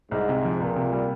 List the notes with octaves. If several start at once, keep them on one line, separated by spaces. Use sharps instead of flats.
C2 G#2
C3
F3
C#2 A#2
C3
G3